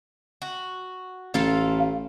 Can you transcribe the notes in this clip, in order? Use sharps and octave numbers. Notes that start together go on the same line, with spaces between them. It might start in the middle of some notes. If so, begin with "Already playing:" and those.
F#4
A1 F4 A4 F5